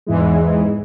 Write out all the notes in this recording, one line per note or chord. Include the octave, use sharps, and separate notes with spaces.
E2 G#2 E3 G#3